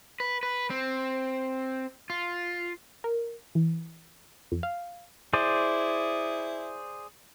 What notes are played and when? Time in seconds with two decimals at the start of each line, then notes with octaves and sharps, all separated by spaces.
0.20 B4
0.43 B4
0.70 C4
2.10 F4
3.04 A#4
3.55 E3
4.52 F2
4.63 F5
5.33 E4 G#4 C5 D5